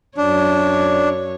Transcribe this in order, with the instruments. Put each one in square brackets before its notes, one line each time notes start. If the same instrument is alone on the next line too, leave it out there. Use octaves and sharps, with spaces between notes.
[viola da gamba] F#2 C#5 [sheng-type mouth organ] D4